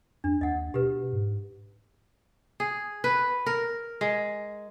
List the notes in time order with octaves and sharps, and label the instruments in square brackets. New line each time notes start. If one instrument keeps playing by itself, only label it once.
[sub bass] F2 [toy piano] D4
[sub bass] D#2 [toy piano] D#5 F#5
[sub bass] B2 [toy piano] G4 B4
[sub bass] G#2
[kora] G#4
B4
A#4
G#3